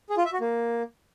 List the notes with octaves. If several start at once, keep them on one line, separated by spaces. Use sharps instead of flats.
G#4
F4
E5
F#4
A#3